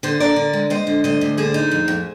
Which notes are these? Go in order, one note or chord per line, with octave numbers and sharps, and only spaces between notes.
D3 G#4 C5
D3 A#4 D5
D3
G#3
G#3 C5 D#5
D3
D2 C5 D#5
D2
D3 G#4 C5
D#4
F2
F2